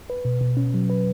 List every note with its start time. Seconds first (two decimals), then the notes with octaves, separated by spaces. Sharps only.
0.10 B4
0.25 B2
0.41 B2
0.57 C#4
0.74 F#3
0.90 B4